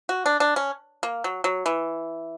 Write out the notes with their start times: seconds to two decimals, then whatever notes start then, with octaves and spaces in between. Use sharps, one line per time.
0.09 F#4
0.26 D4
0.40 D4
0.56 C#4
1.03 A#3
1.24 F#3
1.44 F#3
1.66 E3